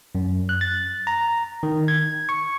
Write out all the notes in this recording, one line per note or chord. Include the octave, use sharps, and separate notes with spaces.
F#2
F#6
A6
A#5
D#3
G#6
C#6